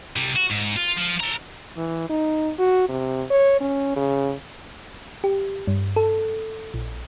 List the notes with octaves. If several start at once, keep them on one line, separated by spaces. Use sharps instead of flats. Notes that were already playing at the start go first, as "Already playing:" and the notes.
C3 G3
F#4
G#2
F4
F3
A4 A#5
E3
D#4
F#4
C3
C#5
C#4
C#3
G4
G2
A4
A#1